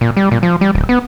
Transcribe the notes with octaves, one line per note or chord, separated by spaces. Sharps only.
A#2
G3
A#2
F3
G3
D1
B3